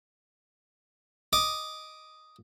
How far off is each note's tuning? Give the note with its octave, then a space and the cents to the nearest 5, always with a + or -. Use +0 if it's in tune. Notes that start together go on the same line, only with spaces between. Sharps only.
D#5 +0 D6 +0